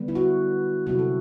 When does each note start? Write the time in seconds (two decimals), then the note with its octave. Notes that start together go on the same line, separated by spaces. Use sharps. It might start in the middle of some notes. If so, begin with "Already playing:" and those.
Already playing: D3 G3 B3
0.08 E4
0.15 F#4
0.87 C3 F#3 C4 E4 F#4
0.99 A4